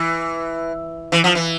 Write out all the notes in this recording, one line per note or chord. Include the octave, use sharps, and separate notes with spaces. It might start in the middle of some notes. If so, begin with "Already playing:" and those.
Already playing: E3
E3
F3
E3